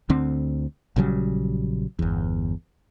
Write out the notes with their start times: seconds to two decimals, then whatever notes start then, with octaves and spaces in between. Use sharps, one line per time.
0.09 D2 D3 C4
0.96 A#1 C#3 F#3 G3
1.99 G1 E2